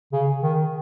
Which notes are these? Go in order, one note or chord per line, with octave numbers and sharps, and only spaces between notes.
C#3
D#3